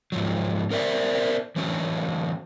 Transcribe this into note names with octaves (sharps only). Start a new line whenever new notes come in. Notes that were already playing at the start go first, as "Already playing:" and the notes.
G#2 F3 F#3
B3 A#4 C5 D5 E5
E3 F#3 A3 C#4